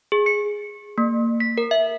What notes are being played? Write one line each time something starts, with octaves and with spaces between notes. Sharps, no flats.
G#4
C#7
A#3
B6
A#4
E5